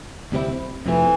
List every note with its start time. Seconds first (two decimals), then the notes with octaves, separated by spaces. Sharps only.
0.32 D2 C3 G3 C4 E4
0.86 F2 C3 E3 F3 A3